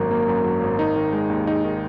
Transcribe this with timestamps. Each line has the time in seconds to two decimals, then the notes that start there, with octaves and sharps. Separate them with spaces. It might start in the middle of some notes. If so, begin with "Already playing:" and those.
Already playing: G#1 F#2 F#3 A#3 A#4
0.11 A#3
0.28 F#2
0.44 F#3
0.62 G#1
0.79 D#4
0.96 D#3
1.13 G#3
1.30 D#2
1.46 D#4 G#4
1.64 D#3